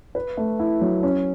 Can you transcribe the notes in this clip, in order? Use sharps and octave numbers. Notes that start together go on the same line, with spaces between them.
B4
A3
E4
F#3
C#4